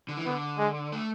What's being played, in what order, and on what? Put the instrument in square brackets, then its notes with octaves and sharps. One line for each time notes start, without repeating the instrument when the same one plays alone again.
[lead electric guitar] D3
E3
[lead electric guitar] D3 [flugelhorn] B3
[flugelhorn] G#3
[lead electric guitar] A3